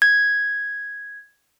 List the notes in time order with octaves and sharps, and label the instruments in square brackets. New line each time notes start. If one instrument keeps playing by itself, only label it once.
[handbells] G#6